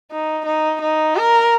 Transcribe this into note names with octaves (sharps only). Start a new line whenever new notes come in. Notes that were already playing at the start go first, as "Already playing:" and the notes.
D#4
D#4
D#4
A#4